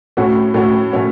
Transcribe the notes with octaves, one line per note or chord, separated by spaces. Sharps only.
A2 A3 C#4 F#4
A2 A3 C#4 F#4
A2 A3 C#4 F#4